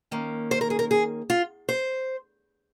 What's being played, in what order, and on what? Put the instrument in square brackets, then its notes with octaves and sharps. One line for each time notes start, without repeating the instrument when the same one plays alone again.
[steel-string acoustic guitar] D#3 A#3 C#4
C5
A#4
G#4
A#4
G#4
F4
C5